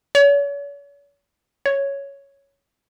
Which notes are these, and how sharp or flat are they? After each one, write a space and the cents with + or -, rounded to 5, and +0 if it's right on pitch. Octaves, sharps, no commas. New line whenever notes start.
C#5 +40
C#5 +0